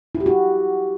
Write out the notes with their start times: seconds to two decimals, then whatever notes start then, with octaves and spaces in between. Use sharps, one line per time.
0.15 E4
0.20 G4
0.26 F#4